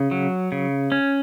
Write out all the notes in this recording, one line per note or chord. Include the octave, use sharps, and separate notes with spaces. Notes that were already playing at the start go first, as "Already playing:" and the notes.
Already playing: C#3
F#3
C#3
C#4